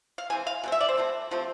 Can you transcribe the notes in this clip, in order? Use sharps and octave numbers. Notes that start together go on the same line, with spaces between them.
F5
E3 G#3 C4 G#5
F5
B2 G#3 C4
E5
D5
C5
B2 A3 C4
C3 F3 A3 C4